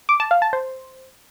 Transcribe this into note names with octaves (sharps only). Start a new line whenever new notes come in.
D6
A5
F5
A5
C5